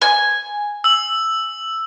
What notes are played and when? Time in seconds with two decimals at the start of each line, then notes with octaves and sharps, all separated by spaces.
0.02 G#5
0.84 E6 F#7